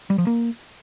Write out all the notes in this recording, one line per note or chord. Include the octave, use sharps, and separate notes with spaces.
G3
F3
A#3